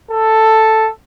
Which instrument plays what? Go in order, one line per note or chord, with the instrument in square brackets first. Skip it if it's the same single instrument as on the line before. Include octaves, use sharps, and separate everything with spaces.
[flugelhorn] A4